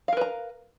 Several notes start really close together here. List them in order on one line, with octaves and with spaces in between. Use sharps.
F5 A#4 B4 A#5